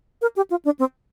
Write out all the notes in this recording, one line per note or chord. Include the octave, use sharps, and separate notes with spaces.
A#4
G4
F4
D4
C4